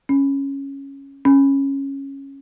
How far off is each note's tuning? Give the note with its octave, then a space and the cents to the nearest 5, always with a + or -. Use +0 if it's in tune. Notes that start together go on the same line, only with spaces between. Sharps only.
C#4 -5
C#4 -10